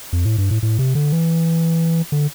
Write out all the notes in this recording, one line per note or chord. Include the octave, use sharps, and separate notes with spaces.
F2
A2
G2
A2
A2
C3
D3
E3
D3